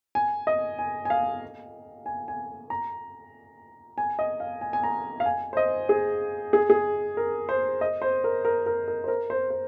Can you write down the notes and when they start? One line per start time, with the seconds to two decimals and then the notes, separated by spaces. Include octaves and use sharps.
0.15 G#5
0.47 D#5
0.79 G#5
1.05 G#5
1.10 F5
2.06 G#5
2.28 G#5
2.70 A#5
3.98 G#5
4.19 D#5
4.40 F5
4.61 G#5
4.73 G#5
4.84 A#5
5.20 F5
5.26 G#5
5.53 C5
5.57 D#5
5.89 G#4
6.53 G#4
6.70 G#4
7.17 A#4
7.49 C5
7.81 D#5
8.02 C5
8.24 A#4
8.45 A#4
8.66 A#4
8.88 A#4
9.04 C5
9.08 A#4
9.30 C5
9.51 C5